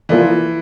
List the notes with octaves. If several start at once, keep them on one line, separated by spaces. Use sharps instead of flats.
E3 F3 A#3 F4 A4 D5